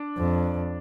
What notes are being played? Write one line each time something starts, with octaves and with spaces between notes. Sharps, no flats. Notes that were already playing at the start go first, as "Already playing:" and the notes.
Already playing: D4
F2